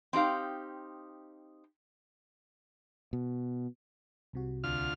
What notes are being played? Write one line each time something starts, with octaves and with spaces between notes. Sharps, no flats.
C4 D#4 G4 F5
B2
C2 C3 F#4
D2 F4 F6